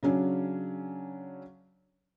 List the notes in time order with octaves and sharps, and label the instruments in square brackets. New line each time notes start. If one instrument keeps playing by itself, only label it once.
[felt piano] C#3 F#3 C#4 D4